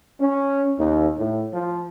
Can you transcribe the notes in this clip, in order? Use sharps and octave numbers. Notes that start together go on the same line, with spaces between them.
C#4
D#2
A2
F3